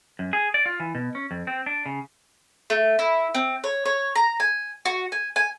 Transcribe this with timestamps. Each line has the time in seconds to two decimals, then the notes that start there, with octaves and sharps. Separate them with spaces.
0.19 F#2
0.33 G#4
0.54 D5
0.66 F4
0.80 E3
0.95 B2
1.15 C#4
1.31 F2
1.47 C4
1.66 D4
1.86 C#3
2.70 A3
2.99 E4
3.35 C4
3.64 C#5
3.86 C#5
4.15 A#5
4.40 G#5
4.86 F#4
5.12 G#5
5.36 G#5